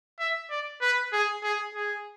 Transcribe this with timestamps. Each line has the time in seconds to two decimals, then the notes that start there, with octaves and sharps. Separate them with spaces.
0.20 E5
0.50 D5
0.82 B4
1.13 G#4
1.43 G#4
1.75 G#4